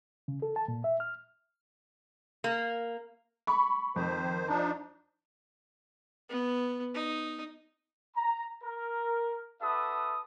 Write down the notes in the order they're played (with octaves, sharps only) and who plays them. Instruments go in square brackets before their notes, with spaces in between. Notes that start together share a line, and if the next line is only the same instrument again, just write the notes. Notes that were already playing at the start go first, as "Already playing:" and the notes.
[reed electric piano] C#3
A4
A5
A#2
E5
F6
[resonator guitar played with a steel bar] A#3
[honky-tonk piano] B5 C#6
[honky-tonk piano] F2 [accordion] D#3 C5
[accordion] F3 D4 D#4 [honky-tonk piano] A5
[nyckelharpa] B3
D#4
[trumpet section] A#5
A#4
D4 F#4 A4 B4 E5 D#6